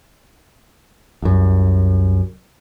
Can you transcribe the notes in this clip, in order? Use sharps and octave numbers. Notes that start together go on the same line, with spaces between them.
C2 F#2